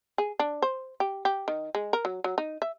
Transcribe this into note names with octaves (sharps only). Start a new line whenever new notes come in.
G#4
D4
C5
G4
G4
D#3
G#3
A#4
F#3
F#3
D#4
E5